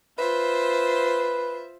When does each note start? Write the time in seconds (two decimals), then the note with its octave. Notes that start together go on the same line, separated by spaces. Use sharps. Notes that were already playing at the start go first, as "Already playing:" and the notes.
0.19 F4 B4 C5 E5